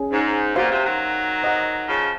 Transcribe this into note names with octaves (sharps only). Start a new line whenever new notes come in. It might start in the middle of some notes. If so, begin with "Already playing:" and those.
Already playing: C#4 G#4
G#2
A#2 F#4 C5 F5 C6
C3
D#3 F#3
C5 D#5 F#5
C#3 F3